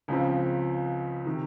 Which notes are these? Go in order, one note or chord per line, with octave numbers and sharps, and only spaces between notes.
C#2 C#3 F3 C4
C3 D#3